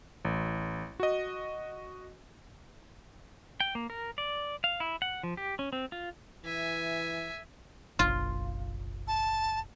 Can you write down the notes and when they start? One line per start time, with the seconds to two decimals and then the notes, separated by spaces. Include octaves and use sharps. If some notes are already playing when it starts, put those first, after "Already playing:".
0.25 A1
1.00 F#4 D#5
3.60 G5
3.75 A#3
3.90 A#4
4.18 D5
4.64 F5
4.80 E4
5.02 F#5
5.23 F3
5.37 G4
5.59 C#4
5.73 C4
5.92 F4
6.45 E3 E5 G#5
7.99 F#1 B1 F4
9.08 A5